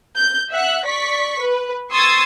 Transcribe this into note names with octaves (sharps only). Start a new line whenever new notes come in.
G6
E5 F#5 F#6
D5 C#6 B6
B4
C6 C#6 D#6 E6 G#6 A6